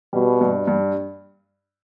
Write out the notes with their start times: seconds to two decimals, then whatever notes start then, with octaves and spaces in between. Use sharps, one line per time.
0.13 B2 G3
0.41 G2
0.67 G2